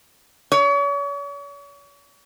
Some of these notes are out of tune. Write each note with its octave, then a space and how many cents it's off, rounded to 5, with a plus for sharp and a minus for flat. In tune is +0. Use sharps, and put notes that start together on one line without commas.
C#5 +40